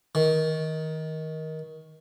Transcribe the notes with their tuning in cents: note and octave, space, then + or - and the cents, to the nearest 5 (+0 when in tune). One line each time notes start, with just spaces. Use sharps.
D#3 +20